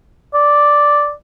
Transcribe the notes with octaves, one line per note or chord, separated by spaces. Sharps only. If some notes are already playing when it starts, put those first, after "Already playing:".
D5